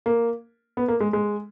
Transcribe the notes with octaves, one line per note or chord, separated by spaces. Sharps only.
A#3
B3
A#3
G#3
G#3